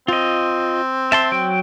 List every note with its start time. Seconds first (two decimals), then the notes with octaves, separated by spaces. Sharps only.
0.08 C4 F4 D#5
1.12 E5 A5 C6
1.32 F#3 G5